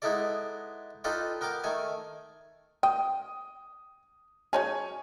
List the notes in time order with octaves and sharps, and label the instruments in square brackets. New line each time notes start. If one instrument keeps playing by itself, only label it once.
[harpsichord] G#3 B3 D#4 E4 A4 D5
D#4 F4 A4 B4 D5 G5
B3 A#4 G5 D6
D#3 A3 A4 G#5
[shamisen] G5 [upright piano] D#6
[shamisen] F#3 D#4 G#4 [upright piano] C#5 G#5